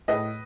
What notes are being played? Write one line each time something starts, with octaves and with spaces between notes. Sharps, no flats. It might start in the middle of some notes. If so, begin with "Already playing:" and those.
A2 B4 D#5